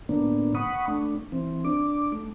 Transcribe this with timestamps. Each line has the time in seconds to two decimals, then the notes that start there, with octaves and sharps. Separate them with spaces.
0.09 A2 D3 A#3 B3 D4
0.55 F#5 B5 C#6 D#6
0.88 A3 D4
1.32 E3 C4
1.65 D4 D6
2.12 A3